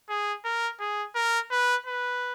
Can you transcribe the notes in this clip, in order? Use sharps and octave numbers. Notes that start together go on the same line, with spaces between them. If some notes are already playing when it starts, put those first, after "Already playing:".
G#4
A#4
G#4
A#4
B4
B4